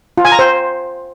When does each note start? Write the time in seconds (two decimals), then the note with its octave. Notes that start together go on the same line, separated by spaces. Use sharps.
0.18 F4
0.25 G#5
0.32 A#5
0.39 C5